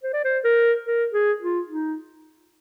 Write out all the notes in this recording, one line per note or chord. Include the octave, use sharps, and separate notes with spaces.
C5
D5
C5
A#4
A#4
G#4
F4
D#4